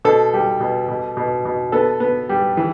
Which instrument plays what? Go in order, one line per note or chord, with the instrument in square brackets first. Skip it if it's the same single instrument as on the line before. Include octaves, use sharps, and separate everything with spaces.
[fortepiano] B2 A4
G3
B2
B2
B2
B2
B3 A4
B3
G3
E3